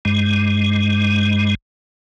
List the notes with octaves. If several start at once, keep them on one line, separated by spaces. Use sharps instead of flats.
G2 G#3